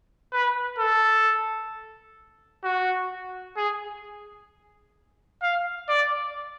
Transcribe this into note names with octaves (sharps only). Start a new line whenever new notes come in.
B4
A4
F#4
G#4
F5
D5